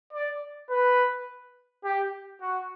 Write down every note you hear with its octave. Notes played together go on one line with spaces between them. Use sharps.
D5
B4
G4
F#4